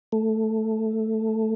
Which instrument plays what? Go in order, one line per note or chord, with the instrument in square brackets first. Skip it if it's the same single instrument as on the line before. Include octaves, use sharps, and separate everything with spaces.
[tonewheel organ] A3